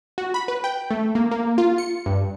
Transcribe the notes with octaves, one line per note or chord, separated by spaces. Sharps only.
F#4
B5
B4
G5
A3
A#3
A#3
F4
C#7
G2